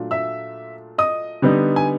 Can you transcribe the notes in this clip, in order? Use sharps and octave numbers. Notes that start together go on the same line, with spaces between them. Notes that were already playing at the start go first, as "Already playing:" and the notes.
Already playing: A#2 F#3 A3 D4 F4
E5 E6
D#5 D#6
D3 G3 B3 D#4
G#5